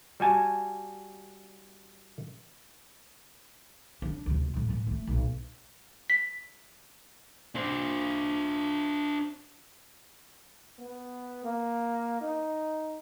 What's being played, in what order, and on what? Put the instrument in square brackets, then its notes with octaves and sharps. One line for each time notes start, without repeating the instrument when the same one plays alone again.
[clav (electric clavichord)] G3 F#4 G#5 A5
[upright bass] D3 D4
D2 C3
A2 D3
A2 E3
G#3 A3
B1 A#2
[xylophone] B6
[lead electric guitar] D4 C5
[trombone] B3
A#3
D#4